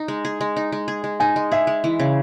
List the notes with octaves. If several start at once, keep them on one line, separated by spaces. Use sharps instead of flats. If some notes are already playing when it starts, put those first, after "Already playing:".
Already playing: D#4
G#3
G#4
G#3
D#4
G#3
G#4
G#3
D#4 G#5
G#3
G#4 E5
G#3
E3
C#3